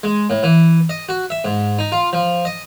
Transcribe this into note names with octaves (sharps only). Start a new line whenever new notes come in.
G#3
A2
E3
D#5
F#4
E5
G#2
D#4
F4
F3
D#5